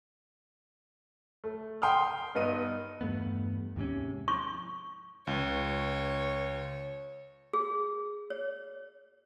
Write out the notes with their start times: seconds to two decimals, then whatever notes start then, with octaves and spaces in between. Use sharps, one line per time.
1.44 A3
1.82 G5 C6 D#6 F6
2.35 G2 B3 D#4 D#7
3.01 E2 G2 A3 B3
3.76 D#2 G#2 C3 C#4
4.28 C#6
5.27 C#2 C#5
7.53 G#4
8.30 C#5